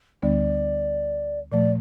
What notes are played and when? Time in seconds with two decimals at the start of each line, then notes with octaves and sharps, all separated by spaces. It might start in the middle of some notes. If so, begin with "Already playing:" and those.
0.22 D2 D3 G3 B3 D4 D5
1.52 A#2 F3 A3 D5